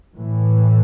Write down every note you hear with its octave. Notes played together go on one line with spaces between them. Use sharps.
A2 E3 A3